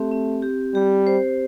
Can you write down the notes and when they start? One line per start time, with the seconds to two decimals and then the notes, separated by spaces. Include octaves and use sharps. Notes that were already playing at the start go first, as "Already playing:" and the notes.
Already playing: A3 C4 G4
0.11 C4
0.42 G4
0.74 G3 G4
1.07 C5